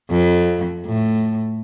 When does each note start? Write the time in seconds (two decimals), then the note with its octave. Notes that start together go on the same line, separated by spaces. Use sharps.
0.10 F2
0.86 A2